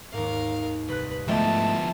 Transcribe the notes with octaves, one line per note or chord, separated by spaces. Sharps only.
D#2 G#2 A#4 F5
C2 B4 F#6
G#2 D3 F3 A3 B3 E4 G5 A5